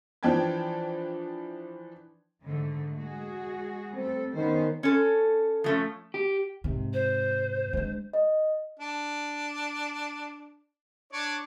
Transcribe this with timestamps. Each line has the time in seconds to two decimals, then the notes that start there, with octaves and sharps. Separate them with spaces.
0.23 E3 F3 D4 G5 A5 G#6
2.44 G#2 D3 A3
2.97 G#3 F#4 G#4
3.94 G3 A3 C4 A4
4.35 D#3 B3 C#4 C5
4.83 C#4 A4
5.64 F3 A3 C#4
6.14 G4
6.64 G#2 C3
6.93 C5
7.73 G#3 D4
8.13 D#5
8.79 D4
11.13 D4 C#5 D5